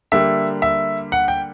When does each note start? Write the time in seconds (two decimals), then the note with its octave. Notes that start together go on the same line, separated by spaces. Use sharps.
0.12 D3 G3 A#3 E5
0.62 E5
1.12 F#5
1.28 G5